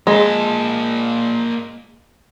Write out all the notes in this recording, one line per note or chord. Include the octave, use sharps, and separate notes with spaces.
A#2 G#3 A5